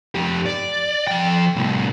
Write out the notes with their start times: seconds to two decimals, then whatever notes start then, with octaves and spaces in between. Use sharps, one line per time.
0.15 F2 G4
0.46 D5
1.07 F3 G5
1.56 C2 A2